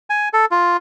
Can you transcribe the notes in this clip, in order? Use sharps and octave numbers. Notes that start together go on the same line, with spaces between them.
G#5
A4
F4